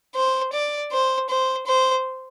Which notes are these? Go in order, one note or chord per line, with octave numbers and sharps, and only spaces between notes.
C5
D5
C5
C5
C5